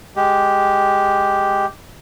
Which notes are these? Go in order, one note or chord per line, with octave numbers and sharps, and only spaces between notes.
G#3 G4